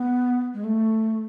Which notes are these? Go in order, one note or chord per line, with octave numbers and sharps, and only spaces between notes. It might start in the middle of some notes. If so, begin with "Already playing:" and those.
Already playing: B3
G#3
A3